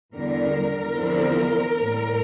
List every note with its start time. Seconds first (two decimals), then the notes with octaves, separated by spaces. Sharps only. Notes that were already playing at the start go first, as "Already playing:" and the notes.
0.15 E2 D3 G3 A#4
0.95 E2 D3 F3 C4 E4
1.76 A2 G3 A#3